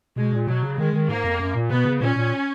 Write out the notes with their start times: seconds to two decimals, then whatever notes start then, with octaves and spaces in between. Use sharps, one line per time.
0.16 B2 G#3
0.32 A#2
0.47 B2 F#3
0.63 C#3
0.78 D#3 G#3
0.93 D#3
1.08 G#2 A#3
1.24 F2
1.39 F#2
1.54 A#2
1.70 B2 B3
1.85 C#3
2.00 A#2 C#4
2.16 A#2